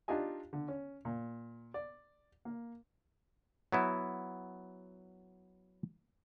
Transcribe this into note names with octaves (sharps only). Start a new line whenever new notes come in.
D4 D#4 F4 G4 D#5 G#5
D3
C#4
A#2
D5
A#3
F#3 B3 E4